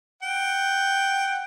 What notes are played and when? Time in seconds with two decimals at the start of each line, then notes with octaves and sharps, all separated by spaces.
0.22 F#5 G5